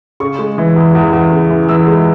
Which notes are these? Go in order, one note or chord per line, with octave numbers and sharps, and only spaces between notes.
C#3 C#6
G#3
E3
E2
E2
E2
C#3
E3
E3 E6
G#3